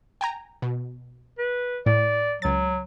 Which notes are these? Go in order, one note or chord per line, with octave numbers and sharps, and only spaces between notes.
G5 G#5 A#5
B2
B4
A2 D5
C#2 F#3 A6